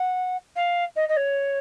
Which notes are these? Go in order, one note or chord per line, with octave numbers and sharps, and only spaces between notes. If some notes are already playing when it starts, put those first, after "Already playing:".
Already playing: F#5
F5
D#5
D#5
C#5